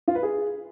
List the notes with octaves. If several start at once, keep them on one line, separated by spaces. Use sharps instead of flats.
F4
B4
G#4